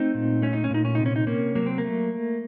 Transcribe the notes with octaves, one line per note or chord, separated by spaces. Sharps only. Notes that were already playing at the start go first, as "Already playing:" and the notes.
Already playing: A3 C4 D#4
A#2
A3 C#4
D#4
C#4
A#2 D#4
C#4
C3 D#4
C#4
D#4
C3 A#3 C#4
F#3 A#3
C4
A#3
A3